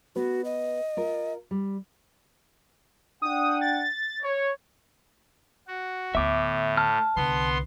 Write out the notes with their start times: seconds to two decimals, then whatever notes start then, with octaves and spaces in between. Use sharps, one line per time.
0.16 B3 F#4 B4
0.45 D#5
0.97 F4 A#4
1.51 G3
3.22 D4 F#5 G5 D#6
3.61 A6
4.22 C#5
5.67 F#4
6.15 D2 A2 B3 E5 D6
6.77 A5 F6
7.16 C2 D3 B3 C6